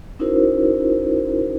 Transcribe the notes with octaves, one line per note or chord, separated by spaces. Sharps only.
C#4 D#4 E4 F#4 A#4 C5